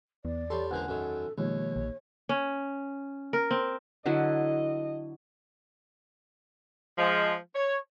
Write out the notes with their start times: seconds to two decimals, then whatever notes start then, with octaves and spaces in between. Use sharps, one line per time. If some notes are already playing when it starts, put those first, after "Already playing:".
0.25 E2 B3 D5
0.50 G3 A4 C#5 A5 C6
0.71 C#2 D3 A#3 C5 F#5 G#5 F#6
0.88 F#2 D#3 A4
1.38 D#2 B2 D#3 F3 G#3 C#5
1.76 A#1
2.29 C#4
3.33 A#4
3.51 C4
4.06 D3 F#3 E4 D#5
6.98 F3 G#3
7.55 C#5